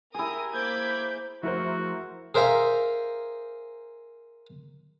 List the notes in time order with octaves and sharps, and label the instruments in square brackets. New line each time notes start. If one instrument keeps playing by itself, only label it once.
[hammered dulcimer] E4 G#4 [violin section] G4 A#4 D#6
[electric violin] A#3 G6 [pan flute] C5 [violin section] B5 D6 G#6
[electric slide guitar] F3 A3 G#4 [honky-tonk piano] E4 A#4 C5 [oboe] F#4
[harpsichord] G#4 A#4 C5 E5 F5 A#5